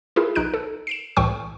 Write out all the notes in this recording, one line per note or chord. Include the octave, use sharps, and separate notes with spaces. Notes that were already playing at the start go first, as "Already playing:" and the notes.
E4 F4 G#4 A#4
B1 D#4 F#6 D7
A4
C7 D7 E7
C2 A2 E3 G5 C#6 E6